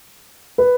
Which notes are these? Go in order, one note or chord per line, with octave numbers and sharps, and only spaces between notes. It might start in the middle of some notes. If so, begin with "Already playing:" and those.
B4